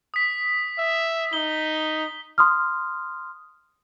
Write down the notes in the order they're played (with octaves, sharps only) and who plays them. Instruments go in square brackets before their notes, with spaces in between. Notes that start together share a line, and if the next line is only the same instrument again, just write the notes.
[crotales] D#6 B6
[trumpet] E5
[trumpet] D#4 [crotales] G7
[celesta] C6 D#6 F6